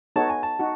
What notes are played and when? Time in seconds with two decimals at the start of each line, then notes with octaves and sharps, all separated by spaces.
0.16 B3 D#4 F#4 A4 C#5 A5
0.29 G#5
0.43 A5
0.59 D#4 F#4